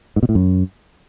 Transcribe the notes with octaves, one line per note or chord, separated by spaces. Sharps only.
G#2
B2
A2
F#2